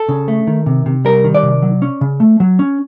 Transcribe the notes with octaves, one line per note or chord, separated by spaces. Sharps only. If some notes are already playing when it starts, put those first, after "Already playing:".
Already playing: A4
C#3
A3
D#3
C3
C3
G3 A#4
D#3
D5
C3
F#3
C#4
C#3
A3
F#3
C#4